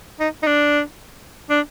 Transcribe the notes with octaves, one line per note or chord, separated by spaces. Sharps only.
D#4
D#4
D4
D4